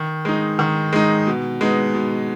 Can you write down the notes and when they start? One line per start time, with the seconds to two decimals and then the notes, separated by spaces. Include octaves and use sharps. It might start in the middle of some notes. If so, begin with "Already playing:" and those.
Already playing: D#3
0.25 G#3 D#4
0.59 D#3
0.93 G#3 D#4
1.27 B2
1.61 G#3 B3 D#4
1.95 B2